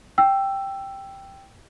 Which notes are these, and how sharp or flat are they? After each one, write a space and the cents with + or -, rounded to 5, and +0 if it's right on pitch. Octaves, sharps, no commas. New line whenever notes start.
G5 +0 E6 +15